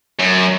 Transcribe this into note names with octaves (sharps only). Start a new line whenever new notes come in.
F#2